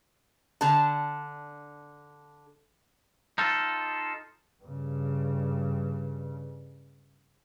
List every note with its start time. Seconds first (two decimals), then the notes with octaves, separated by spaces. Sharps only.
0.61 D3 A5
3.38 D#4 F4 A4
4.63 G2 C#3